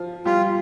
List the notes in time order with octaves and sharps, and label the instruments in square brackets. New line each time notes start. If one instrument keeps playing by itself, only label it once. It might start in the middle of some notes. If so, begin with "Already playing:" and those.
Already playing: [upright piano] F3 F4
[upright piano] G3 G4 [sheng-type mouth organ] F4